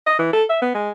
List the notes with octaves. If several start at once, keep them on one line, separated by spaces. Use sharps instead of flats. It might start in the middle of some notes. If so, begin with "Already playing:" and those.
D#5
E3
A4
E5
B3
G#3